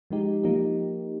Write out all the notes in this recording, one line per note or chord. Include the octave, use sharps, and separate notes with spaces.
F3 G#3 D#4 G4
F3 A#3 D#4 G4